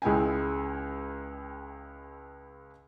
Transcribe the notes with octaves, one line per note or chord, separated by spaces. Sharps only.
C#2 G#3 E4 G5 G#5